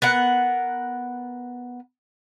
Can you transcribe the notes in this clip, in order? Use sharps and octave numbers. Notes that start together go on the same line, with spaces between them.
B3 A#4 F#5